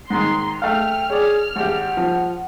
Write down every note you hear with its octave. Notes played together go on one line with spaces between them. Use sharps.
G#2 D#3 A#5 C6
A3 F5 G5 F6
G#4 C#5 D5
G#1 G4 F#5
F3